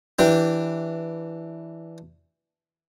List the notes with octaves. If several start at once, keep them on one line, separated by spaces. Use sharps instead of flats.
E3 D4 G4